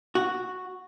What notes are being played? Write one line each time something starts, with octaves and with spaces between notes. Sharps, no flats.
F#4